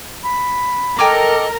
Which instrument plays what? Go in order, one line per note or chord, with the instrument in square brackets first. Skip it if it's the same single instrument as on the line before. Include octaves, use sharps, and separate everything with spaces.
[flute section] B5
[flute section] A4 D#5 [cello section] A#4 [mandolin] G5 G#5 D6